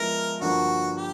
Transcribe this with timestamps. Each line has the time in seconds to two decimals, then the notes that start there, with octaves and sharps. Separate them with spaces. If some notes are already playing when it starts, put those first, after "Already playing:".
Already playing: F3 G#3 B3 E4 A#4
0.41 G2 D3 F3 A#3 F#4
0.98 G4